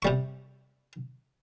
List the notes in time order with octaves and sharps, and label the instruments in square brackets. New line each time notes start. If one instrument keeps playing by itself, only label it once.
[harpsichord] C3 G3 C#6